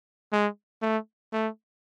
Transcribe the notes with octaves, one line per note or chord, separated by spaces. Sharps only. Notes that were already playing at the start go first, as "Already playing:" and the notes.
G#3
A3
A3